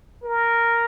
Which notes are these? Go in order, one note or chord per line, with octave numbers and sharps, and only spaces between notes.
A#4